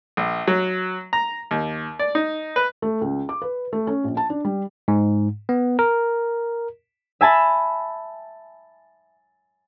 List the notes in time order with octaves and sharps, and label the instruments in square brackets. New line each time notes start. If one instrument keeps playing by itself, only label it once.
[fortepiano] A#1
F#3
A#5
D#2
D5
D#4
B4
[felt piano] A3
C#2
D6
B4
A3
C#4
A#1
A5
D4
G3
[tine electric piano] G#2
B3
A#4
[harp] E5 G#5 A5 B5